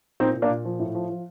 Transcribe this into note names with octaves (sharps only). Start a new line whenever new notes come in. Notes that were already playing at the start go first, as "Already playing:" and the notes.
A#2 C4 D#4
A#2
A#3 D4
A#2
F3
A2
F3
F3